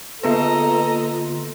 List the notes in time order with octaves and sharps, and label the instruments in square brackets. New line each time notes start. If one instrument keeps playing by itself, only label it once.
[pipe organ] D3 F4 [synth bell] A#3 B3 B4 [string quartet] A4 D#5 A#5